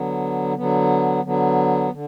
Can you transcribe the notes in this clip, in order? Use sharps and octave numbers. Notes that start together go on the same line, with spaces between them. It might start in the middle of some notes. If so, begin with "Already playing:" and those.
Already playing: D3 F#3 B3
D3 F#3 B3
D3 F#3 B3
D3